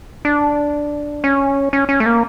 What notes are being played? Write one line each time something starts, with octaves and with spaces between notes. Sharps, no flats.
D4
C#4
C#4
C#4
A3
A#3